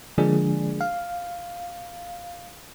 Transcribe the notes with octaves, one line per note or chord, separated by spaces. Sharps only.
D3 F3 G#3 A#3 D4 G#4
F5